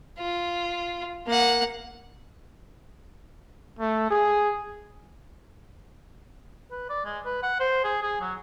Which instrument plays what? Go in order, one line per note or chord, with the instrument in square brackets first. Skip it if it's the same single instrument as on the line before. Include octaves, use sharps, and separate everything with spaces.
[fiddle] F4
A#3 F#5
[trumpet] A3
G#4
[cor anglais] B4
D5
G#3
B4
F#5
C5
G#4
G#4
F#3